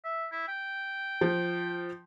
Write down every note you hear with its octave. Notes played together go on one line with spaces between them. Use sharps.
E5
E4
G5
F3